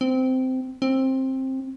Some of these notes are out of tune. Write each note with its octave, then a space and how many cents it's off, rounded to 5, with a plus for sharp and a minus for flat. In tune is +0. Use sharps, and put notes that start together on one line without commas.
C4 -15
C4 +15